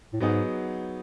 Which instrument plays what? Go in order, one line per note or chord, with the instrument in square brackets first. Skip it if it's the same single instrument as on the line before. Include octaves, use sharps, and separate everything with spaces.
[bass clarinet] A2
[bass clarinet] G#2 [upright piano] F#3 B3 D#4 G#4